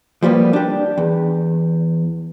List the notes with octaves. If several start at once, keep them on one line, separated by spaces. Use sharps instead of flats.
F3 G3 A#3 B3
D4 G4
E2